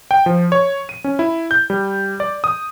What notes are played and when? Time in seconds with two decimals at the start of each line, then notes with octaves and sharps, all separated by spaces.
0.11 G5
0.26 F3
0.52 C#5
0.89 D#7
1.04 C#4
1.19 E4
1.51 G6
1.70 G3
2.20 D5
2.44 D#6